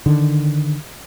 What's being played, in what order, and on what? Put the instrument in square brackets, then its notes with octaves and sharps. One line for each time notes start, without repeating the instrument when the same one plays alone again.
[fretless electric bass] D3 D#3